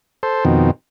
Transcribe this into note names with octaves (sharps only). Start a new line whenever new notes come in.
A4 C5
F2 B2 D#3 C4